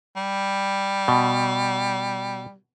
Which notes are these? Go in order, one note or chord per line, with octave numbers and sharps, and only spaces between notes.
G3
B2